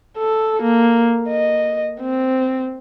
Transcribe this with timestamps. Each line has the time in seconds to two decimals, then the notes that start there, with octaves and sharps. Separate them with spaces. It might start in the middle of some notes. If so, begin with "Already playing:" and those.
0.18 A4
0.62 A#3
1.29 D#5
2.01 C4